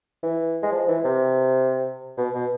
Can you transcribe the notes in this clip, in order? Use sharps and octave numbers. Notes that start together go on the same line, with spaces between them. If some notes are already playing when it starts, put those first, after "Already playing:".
E3
G#3
F3
E3
C3
B2
B2